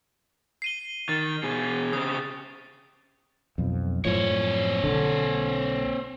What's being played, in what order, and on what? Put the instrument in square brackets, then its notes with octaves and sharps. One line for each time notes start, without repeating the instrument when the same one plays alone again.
[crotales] C7 D#7 G7
[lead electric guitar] D#3 [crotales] A6
[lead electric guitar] B2 G#4
[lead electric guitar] C#3 C4 [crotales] D#6
[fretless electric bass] B1 F2
[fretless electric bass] F#2 A2 F3 [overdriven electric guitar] C4 C#5
[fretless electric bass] B1 D3